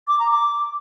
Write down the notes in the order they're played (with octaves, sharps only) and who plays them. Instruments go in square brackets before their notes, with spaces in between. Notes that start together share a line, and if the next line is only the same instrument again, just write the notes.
[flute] D6
A#5
D6